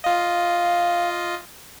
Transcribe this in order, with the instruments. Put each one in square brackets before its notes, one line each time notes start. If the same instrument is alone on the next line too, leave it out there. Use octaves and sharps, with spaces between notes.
[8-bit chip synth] F4 D#5 [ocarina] F5